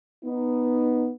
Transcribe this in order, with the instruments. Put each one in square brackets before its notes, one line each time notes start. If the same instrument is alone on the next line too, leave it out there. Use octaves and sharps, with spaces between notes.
[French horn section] B3 D#4